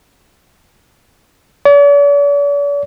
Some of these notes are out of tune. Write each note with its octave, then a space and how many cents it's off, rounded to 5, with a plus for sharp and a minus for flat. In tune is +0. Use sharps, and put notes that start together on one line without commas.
D5 -45